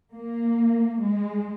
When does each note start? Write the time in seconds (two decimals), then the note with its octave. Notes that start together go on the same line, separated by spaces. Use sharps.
0.13 A#3
1.01 G#3